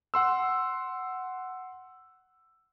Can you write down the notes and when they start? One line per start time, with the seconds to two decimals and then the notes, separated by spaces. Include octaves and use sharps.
0.14 F#5 C6 E6